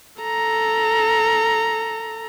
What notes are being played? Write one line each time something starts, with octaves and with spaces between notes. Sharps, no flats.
A4 A#5